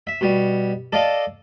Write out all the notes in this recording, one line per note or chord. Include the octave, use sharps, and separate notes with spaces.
E5
B2 G3
A4 D5 D#5 F5